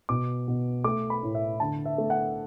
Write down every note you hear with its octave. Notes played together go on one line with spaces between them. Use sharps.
B2 D6
B2
A3 D6
B5
A2
E5
D3 A5
E5
A3
F#5